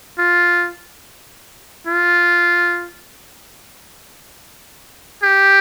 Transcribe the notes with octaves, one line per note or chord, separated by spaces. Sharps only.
F4
F4
G4